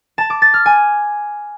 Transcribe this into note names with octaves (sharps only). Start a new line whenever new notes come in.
A5
D6
A6
F6
G#5